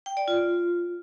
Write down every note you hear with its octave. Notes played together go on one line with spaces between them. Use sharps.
G5
D5
F4